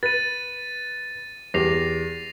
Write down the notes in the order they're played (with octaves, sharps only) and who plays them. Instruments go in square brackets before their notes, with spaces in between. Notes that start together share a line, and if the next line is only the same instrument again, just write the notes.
[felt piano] B4 [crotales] A6 D#7
[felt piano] E2 G4 [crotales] A#6 C7 F7